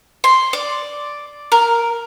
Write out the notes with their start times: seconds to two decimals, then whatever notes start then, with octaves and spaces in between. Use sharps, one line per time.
0.24 C6
0.53 D5
1.52 A#4